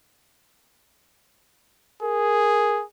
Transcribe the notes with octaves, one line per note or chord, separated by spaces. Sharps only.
G#4 A#4